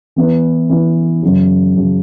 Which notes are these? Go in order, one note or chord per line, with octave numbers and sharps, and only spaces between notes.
E3 B3 E4 B4
E3 B3 E4 B4
F#2 C#3 F#3
F#2 C#3 F#3